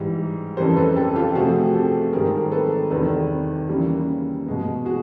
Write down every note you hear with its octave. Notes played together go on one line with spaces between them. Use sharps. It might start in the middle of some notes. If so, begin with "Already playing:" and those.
Already playing: G#2 E3 G3
F2 C#3 E3 G3 A#4 C5
A4 B4
G4 A4
F4 G4
C3 F3 A3 C4 F#4 G#4
G4 A4
G#2 D#3 G3 C4 G#4 A#4
A4 B4
E2 C3 D#3 G3 A4 B4
C#3 E3 G3 A#3
B2 G#3 B3
F#4 G#4